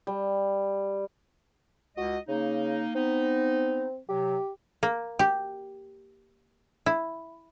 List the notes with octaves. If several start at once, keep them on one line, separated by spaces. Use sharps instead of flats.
G3
C#2 F#4 D#5
C#3 A#3 D#4
B3 C4 D#4
C3 F#3 G4
A#3
G4
E4